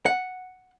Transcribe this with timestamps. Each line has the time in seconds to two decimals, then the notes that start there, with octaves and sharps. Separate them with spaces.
0.06 F#5